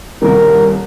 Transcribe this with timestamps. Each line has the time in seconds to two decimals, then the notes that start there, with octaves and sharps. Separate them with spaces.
0.22 D#1 C2 A#4